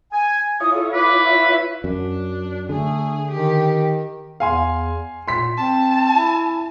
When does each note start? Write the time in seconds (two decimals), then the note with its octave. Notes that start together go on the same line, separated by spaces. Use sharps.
0.12 G#5
0.60 E4 F4 C#5 D#6
0.74 A4
0.93 B4 D6
1.23 E5
1.84 F#2 D4
2.69 D3 A3 G#4
3.31 D#3 G4
4.40 E2 F5 G#5 C6
5.28 A#2 C6 B6
5.57 C4 A5
6.15 E4